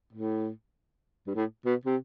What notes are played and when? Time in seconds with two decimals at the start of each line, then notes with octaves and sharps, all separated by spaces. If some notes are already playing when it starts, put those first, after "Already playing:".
0.13 A2
1.27 G2
1.35 A2
1.65 B2
1.85 C3